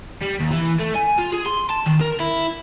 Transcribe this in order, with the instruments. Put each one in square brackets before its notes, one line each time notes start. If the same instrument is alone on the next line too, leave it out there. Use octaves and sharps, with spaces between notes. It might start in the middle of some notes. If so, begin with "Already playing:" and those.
[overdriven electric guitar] G3
D#2
E3
A3
G#5
F4
G#4
C6
A5
D#3
A#4
E4